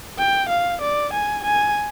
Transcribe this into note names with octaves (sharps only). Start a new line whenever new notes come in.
G5
F5
D5
G#5
G#5